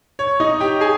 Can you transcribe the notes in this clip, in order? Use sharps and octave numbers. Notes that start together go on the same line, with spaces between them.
C#5
D#4 D#5
G4 G5
G#4 G#5